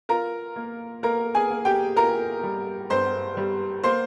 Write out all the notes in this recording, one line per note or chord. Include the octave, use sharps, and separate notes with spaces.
F4 A#4 A#5
A#3
A#3 A#4 A#5
G#4 G#5
A#3
G4 G5
F4 A#4 A#5
G3
G2 C5 C6
G3
A#3 C5 C6